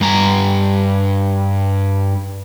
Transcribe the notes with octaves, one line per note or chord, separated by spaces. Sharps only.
G2 A#5